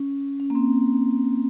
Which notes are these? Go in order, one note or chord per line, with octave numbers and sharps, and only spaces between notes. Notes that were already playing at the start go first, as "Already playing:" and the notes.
Already playing: C#4
C#4
A#3
C4